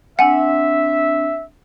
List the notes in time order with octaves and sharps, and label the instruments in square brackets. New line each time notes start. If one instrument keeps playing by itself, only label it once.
[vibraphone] C4 D4 [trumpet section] E5 [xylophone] F#5 G#5